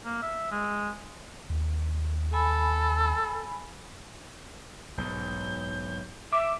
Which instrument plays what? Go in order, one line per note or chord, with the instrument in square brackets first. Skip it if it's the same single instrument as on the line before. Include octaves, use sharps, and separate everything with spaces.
[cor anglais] A#3
E5
G#3
[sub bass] D#2
[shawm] A4 [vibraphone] G#5 B5
[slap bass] B1 G#2 [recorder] G6
[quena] E5 [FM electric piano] D6